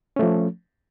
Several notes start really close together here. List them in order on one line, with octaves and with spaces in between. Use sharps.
C#4 A3 F3